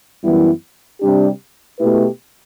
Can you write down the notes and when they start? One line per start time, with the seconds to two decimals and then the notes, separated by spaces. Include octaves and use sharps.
0.23 F#2 E3 G3 B3 E4
1.01 C3 G3 D4 G4
1.79 B2 A3 E4 G4 B4